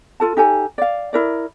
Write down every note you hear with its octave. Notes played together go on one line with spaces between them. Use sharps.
F4 A4 A5
D#4 G4 A4 G#5
D5 F5
E4 A#4 D5